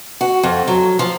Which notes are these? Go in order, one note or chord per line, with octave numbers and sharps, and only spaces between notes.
F#4
F2
F#3
F3